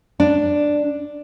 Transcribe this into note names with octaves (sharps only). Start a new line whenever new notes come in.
D4